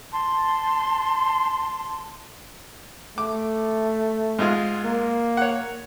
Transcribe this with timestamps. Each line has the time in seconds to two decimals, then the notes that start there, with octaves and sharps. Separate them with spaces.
0.12 A5 C6
3.18 A3 D6
4.39 G#2 G#3 F4
4.84 A#3
5.37 C#5 F#5